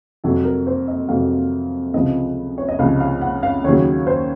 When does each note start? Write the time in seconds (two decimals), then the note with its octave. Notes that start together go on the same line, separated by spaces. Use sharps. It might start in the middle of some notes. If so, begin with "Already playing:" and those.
0.24 F2 C3 F#3 A4
0.45 A#4
0.67 C5
0.88 D#5
1.09 F2 C3 F#3 F5
1.94 C#2 C3 F3 D#5
2.58 C#5
2.68 D#5
2.79 C#2 C3 F3 F5
3.00 F5
3.21 F#5
3.43 F5
3.64 D#2 C#3 F#3 C#5
4.07 C5